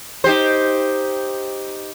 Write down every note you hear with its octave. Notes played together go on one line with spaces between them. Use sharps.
D#4 G4 C5